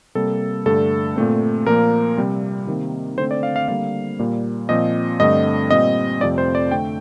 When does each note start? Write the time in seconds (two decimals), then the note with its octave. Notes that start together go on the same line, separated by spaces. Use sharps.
0.15 C3 G3 A#3 A4
0.66 G2 D3 A3 A4
1.16 A#2 A3 C4
1.66 A#2 F3 A#3 A#4
2.17 C3 G3 C4
2.67 C3 D#3 A#3
3.18 D3 A3 C4 C5
3.31 D5
3.43 F5
3.56 F5
3.68 D3 G3 A#3 F5
4.19 A#2 G3 A#3
4.69 A#2 F3 C4 D#5
5.20 G2 D3 A3 C4 D#5
5.71 A#2 G3 C4 D#5
6.20 F2 C3 F3 A3 C4 D5
6.38 C5
6.55 D5
6.71 D3 A3 C4 G5